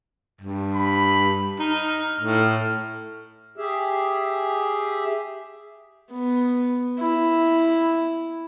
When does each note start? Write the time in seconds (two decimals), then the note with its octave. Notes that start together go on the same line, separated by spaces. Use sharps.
0.41 G2
0.75 B5
1.60 D#4 F6
2.20 A2
3.57 G4 G#4 E5
6.11 B3
6.99 E4